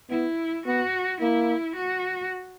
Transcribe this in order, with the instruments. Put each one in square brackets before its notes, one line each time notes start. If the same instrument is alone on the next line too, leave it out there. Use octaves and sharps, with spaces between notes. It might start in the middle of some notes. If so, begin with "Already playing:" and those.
[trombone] B3 [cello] E4
[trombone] B3 [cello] F#4
[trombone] A#3 [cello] E4
[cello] F#4